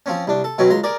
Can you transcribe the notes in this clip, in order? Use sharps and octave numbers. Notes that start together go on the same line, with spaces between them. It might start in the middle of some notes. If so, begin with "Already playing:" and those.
F3 C4 C#4
C2 D4
A4
B2 F#3 C4 C#4
C#2 A#5 C6
G#4 A#4 D5